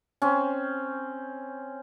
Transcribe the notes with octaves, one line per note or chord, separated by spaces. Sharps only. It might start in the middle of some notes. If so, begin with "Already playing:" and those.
C4 C#4